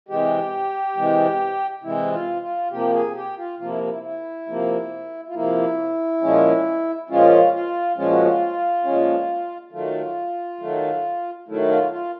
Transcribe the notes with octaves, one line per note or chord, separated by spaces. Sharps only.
C3 E3 G#3 G4
C3 E3 G#3
C3 E3 G#3 E4
F4
F4
C3 F3 A#3 G4
G#4
G4
F4
C3 F3 A#3 F4
E4
E4
E4
C3 F3 A#3
F4
C3 F3 A#3 E4
A#2 F3 G#3 C#4
A#2 F3 G#3 C#4 F4
F4
A#2 F3 G#3 C#4 F4
F#4
F4
A#2 F3 G#3 C#4
D#3 F#3 A3 F4
D#3 F#3 A3
D#3 F#3 A3 E4
E4
F4
F4